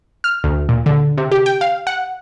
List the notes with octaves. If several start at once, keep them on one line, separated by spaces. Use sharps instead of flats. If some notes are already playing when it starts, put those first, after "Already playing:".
F6
D2
A#2
D3
C3
G4
G5
F5
F#5